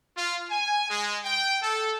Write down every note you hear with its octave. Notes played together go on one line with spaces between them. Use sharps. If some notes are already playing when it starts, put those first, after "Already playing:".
F4
G#5
G#3
G5
A4